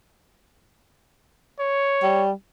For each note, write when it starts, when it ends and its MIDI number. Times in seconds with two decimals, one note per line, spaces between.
1.60 2.23 73
2.03 2.32 55